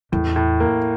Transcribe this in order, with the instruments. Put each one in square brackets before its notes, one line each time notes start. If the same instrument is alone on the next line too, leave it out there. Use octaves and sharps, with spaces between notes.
[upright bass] E2 [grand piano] A2
[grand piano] A2
A#3